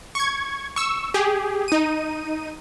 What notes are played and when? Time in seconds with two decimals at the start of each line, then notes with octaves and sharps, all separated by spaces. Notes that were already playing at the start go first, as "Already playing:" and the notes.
0.15 C#6 G#6
0.76 C#6 E6
1.14 G4 G#4
1.68 D#4 D#7